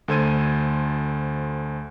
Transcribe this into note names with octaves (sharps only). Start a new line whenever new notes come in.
D2 A4 C5 G#6 D#7